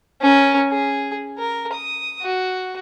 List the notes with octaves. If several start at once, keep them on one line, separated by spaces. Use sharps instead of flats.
C#4 A#4
G#4
A#4
D#6
F#4